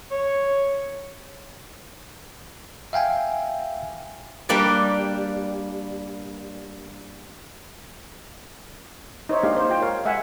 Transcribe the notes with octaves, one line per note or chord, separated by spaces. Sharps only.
C#5
E5 F5 G5 G#5
G3 A#3 D4 B4 D5
D#4 C5 C#5 E5
G#3 A#3 D4 D#4 G4 F5
C5
F4 G5
A#4 C#5 F5
G#3 E5 F#5 G#5